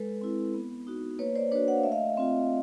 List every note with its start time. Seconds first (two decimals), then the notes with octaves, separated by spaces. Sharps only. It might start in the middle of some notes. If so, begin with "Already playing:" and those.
Already playing: G#3 A4 B4
0.21 C4 E4
0.54 B3
0.87 D#4 F#4
1.19 A#3 B4 C#5
1.36 C5 D5
1.52 D4 B4 C#5
1.56 F#4
1.68 F#5
1.76 F5
1.83 A3 E5
1.92 D#5 F5
2.17 C4 F4